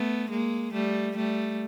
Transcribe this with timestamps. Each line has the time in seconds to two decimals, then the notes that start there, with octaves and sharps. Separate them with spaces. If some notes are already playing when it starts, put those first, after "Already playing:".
Already playing: A3 B3
0.30 G#3 A#3
0.73 G3 A3
1.16 G3 A3